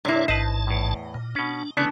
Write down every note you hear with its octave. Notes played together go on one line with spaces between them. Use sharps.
G2 C3 A#3 E4 C#5 D5
A1 G#2 B4 C5 D#5 A5
E2 A2
A#2
B2 C#4 D4
C#3 E3 A3 B3 C#4 D4 D5